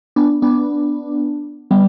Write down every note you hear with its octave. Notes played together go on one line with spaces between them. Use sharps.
B3 D4
B3 D4
G3 B3